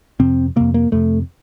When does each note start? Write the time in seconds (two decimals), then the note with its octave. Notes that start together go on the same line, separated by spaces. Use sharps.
0.20 F2 C3 C4
0.56 F2 C3 A#3
0.74 A#3
0.92 F2 C3 A3